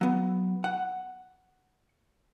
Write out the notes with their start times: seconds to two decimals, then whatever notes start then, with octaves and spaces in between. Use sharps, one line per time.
0.01 F#3 B3
0.64 F#5